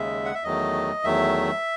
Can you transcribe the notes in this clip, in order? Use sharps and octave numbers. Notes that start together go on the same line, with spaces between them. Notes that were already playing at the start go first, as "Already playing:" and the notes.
Already playing: D#2 C#3 G#3 E5
F#5
E5
E2 D#3 F#3 A3 D#5
E2 D#3 F#3 A3 E5